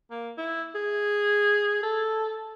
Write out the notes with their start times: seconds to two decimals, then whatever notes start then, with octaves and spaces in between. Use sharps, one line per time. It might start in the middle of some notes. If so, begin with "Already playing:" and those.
0.11 A#3
0.38 E4
0.75 G#4
1.83 A4